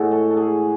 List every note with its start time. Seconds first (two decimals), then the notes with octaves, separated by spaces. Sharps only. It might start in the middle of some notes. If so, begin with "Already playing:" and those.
Already playing: A2 G#3 E4 F#4
0.12 A4
0.30 A4
0.37 G#4